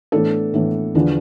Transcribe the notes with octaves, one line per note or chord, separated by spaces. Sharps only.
A2 E3 B3 D4 A4
A2 E3 B3 D4
E2 D3 F3 B3 D4